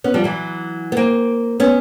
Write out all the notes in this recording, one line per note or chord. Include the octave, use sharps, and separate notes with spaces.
B3 C#4
F3 G3
E3 F#3
B3
A#3 C4
B3 C#4